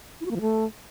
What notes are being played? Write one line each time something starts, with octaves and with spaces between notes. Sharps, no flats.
E4
F#4
A#3
F3
A3